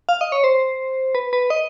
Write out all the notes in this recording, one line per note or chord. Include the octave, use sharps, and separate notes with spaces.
F5
D#5
C#5
C5
B4
B4
D#5